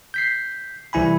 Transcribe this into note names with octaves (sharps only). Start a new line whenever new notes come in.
G6 B6 C7
C2 E3 E4 G#5 B5